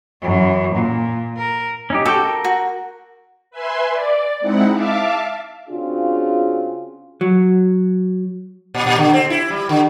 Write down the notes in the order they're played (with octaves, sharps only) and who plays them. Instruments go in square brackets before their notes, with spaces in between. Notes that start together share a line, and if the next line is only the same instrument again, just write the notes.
[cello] F#2 E3
A#2
A#4
[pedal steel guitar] C#4 D#4 G4
[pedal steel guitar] F#4 G4 G5 [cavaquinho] A4
[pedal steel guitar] A#4
[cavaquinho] F#4
[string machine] B4 E5 G#5 C6
D5
G#3 C4 D#4 E4 F#5
E5 F5 A5 D6
[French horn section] C#3 C4 D4 F4 F#4 G#4
[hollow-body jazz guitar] F#3
[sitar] A#2
A#2
D3
C4
E4
G3
D3